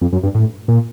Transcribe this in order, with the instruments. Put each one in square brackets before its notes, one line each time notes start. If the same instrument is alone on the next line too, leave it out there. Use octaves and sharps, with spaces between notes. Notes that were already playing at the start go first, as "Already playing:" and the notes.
[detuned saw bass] F2
F#2
G2
A2
A#2